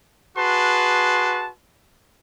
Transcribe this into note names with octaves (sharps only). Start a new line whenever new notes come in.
F#4 G#4 B4 A5 C6